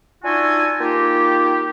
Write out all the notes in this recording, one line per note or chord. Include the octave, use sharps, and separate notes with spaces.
D4 D#4 F4 F#4 E5 G#5
A#3 D#4 F4 G4